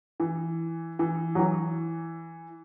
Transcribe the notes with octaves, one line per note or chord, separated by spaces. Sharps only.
E3
E3
F#3
E3